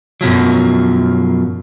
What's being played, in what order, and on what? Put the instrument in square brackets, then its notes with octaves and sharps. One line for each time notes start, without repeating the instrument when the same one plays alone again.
[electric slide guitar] F#2 B2 F3 F#3